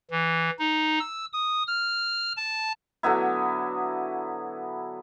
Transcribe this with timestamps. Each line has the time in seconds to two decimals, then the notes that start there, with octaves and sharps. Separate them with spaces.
0.11 E3
0.59 D#4
1.00 E6
1.33 D#6
1.67 F6
2.37 A5
3.03 D3 F#3 B3 E4